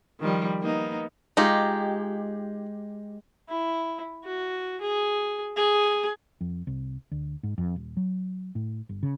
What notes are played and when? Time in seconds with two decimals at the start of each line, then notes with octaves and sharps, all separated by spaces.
0.20 D#3 F3 G3
0.62 A#3 B3 D#4
1.37 G#3 D#4 F4 G4
3.49 E4
4.25 F#4
4.81 G#4
5.56 G#4
6.41 F2
6.67 C2
7.11 D2
7.43 G#2
7.58 F2
7.76 D#1
7.97 F#3
8.55 A2
8.89 G1
9.03 C#3